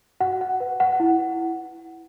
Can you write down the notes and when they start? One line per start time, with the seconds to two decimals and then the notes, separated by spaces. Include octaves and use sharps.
0.20 F#4 F#5
0.41 F#5
0.60 B4
0.80 F#5
1.00 E4